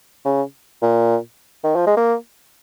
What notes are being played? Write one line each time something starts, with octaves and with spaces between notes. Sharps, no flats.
C#3
A#2
D#3
F3
G#3
A#3